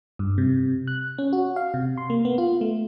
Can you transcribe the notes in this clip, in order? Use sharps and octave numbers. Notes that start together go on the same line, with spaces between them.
G2
C3
F#6
C#4
F#4
F5
C3
C6
A#3
B3
F4
A3